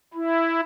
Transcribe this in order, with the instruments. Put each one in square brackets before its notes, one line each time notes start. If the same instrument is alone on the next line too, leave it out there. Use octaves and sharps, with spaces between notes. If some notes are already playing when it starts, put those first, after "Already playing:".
[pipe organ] E4